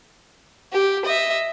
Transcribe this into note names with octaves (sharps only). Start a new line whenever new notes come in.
G4
D#5 E5